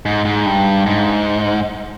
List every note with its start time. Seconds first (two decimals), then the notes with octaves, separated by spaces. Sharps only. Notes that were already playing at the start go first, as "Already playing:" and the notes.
0.06 G#2
0.25 G#2
0.46 G2
0.86 G#2